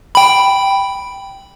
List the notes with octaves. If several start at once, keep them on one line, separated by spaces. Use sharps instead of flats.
G5 B5